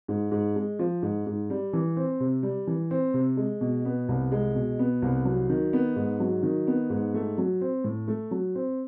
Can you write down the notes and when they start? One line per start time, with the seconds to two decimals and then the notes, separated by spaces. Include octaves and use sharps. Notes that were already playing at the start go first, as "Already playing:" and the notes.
0.08 G#2
0.32 G#2
0.56 G#3
0.79 F3
1.02 G#2
1.26 G#2
1.50 G3
1.73 E3
1.96 C4
2.20 C3
2.43 G3
2.67 E3
2.91 C4
3.14 C3
3.37 G#3
3.61 B2
3.85 B3
4.09 C2
4.32 G#3
4.55 B2
4.79 B3
5.02 C2
5.25 F#3
5.49 D#3
5.73 B3
5.96 G#2
6.20 F#3
6.43 D#3
6.67 B3
6.90 G#2
7.14 A3
7.38 F#3
7.61 C4
7.84 A2
8.08 A3
8.31 F#3
8.55 C4